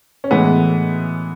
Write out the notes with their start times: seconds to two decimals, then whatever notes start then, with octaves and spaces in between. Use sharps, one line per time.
0.24 C#4
0.31 A2 E3 G#3 B3